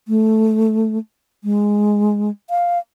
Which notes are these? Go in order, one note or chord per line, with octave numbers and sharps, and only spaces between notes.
A3
G#3
F5